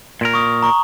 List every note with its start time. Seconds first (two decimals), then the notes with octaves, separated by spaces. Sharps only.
0.21 A#2 A#4
0.34 C#6 D#6
0.62 A#5 C#6